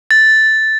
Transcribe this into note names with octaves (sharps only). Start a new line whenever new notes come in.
A6